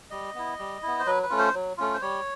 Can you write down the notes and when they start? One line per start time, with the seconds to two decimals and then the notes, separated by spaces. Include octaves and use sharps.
0.11 G3 D#5
0.35 B3 E4
0.59 G3
0.82 B3 E4
0.99 C5
1.06 F#3 B4
1.22 B4
1.30 A3 C#4 F4
1.38 C5
1.54 F#3
1.77 A3 C#4 F4
1.94 C5
2.01 G3 C#5